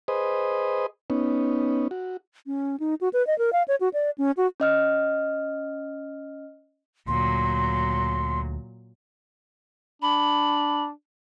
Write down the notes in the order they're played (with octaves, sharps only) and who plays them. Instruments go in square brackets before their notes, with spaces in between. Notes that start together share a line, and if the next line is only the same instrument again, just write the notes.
[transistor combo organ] G#4 B4 C5 D#5
B3 C#4 D#4
F#4
[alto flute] C#4
D#4
F#4
B4
D#5
A#4
F5
C#5
F#4
D5
C#4
F#4
[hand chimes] C#4 D#5 F6
[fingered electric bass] D2 [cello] A#2 F#3 [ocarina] C6
[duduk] D4 [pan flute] B5